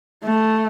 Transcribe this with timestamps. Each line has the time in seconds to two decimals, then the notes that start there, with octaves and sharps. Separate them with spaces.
0.24 A3